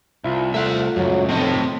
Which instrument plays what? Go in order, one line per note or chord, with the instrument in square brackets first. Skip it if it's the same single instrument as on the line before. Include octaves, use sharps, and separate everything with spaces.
[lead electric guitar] C2 [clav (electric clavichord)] E4 F4
[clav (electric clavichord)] A3 F4 [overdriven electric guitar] E5 F#5
[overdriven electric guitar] C#2 F#2 [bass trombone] F#3
[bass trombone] F1 [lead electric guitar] A2 [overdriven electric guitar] C4 D#5